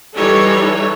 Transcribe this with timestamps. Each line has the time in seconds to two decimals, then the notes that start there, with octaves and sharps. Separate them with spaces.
0.17 E3 G3 D#4 A4 C#5